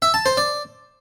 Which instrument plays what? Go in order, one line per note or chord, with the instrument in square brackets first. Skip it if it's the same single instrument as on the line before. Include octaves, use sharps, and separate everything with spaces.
[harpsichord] E5
A5
C5
D5